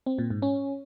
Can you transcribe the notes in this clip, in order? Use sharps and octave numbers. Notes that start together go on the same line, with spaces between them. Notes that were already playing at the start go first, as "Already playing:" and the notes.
C4
A#2
G#2
C#4